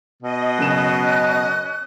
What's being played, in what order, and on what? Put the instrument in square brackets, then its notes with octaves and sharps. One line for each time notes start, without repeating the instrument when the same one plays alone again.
[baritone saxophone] B2 [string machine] D#5
[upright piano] F#2 C#3 E7 [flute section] C#4 F#6